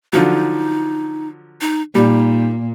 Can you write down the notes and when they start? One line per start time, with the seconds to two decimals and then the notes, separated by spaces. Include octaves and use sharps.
0.13 D3 F3 F#3 D#4
1.61 D#4
1.95 A#2 G3 D#4